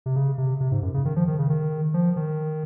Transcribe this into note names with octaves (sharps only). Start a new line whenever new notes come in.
C3
C#3
C3
C3
G#2
F#2
C#3
D#3
F3
D#3
C#3
D#3
F3
D#3